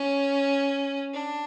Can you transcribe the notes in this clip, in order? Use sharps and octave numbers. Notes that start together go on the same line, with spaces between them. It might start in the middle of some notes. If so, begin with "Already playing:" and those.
Already playing: C#4
D4